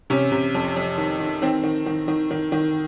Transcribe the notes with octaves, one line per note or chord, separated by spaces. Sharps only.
C3 C#4
C3
F2
F2
D#3
D#3
D#3 C4
D#3
D#3
D#3
D#3
D#3